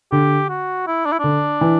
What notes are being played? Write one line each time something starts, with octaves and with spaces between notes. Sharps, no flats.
D3 G4
F#4
E4
D4
E4
D3 D4
E3